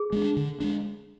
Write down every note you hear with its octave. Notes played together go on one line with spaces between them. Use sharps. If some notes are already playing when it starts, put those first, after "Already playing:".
Already playing: G#4
G#3 B3 D4
D3
G#3 B3 D4